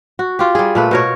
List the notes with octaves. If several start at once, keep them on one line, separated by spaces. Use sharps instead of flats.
F#4
F4 G4
G3 G#4
A#2 A3 B4
B2 A#4 C#5